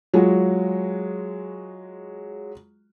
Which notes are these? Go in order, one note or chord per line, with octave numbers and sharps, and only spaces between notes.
F#3 G#3 F4 F#4